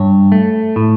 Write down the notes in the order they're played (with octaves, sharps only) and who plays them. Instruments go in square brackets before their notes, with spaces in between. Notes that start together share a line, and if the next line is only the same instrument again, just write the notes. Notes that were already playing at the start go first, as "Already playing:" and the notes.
Already playing: [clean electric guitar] G2 C#5
A3
A2